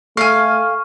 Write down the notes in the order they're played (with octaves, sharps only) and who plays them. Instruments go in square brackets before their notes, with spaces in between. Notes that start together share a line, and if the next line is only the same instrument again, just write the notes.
[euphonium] A3 [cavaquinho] F5 G#5 [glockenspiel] C#6 F6